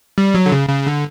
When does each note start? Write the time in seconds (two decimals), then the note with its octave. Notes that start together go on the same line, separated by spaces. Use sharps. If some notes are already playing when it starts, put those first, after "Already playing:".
0.18 G3
0.34 F#3
0.46 D3
0.52 C#3
0.69 C#3
0.87 D3